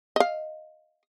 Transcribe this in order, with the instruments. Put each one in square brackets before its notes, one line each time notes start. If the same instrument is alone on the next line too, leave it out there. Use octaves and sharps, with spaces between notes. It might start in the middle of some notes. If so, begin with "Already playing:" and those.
[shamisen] D#5 F5